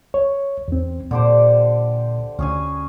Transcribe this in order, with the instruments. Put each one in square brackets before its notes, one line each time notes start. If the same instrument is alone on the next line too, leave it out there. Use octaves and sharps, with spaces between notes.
[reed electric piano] C#5
E2 C4
[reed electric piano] A#2 [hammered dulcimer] D3 G4 C5
[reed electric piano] D2 [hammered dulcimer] C#4 G#4 G#5